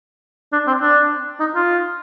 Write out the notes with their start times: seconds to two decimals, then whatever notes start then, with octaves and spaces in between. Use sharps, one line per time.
0.53 D4
0.67 C4
0.81 D4
1.40 D#4
1.55 F4